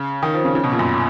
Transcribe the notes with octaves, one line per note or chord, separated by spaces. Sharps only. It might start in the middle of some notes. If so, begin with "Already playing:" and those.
Already playing: C#3
D#3
F3
C#3
C#3
B2
A#2
F#2